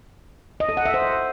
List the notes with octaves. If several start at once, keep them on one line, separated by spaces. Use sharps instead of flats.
D#5
A4
F#5
E5
C5